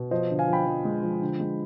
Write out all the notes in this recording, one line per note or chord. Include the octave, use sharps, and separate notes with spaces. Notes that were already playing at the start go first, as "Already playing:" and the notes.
Already playing: B2
F3 C5 D#5
D3
F5 G#5
F3
G5 B5
F3
G#3
F3
D3
G#3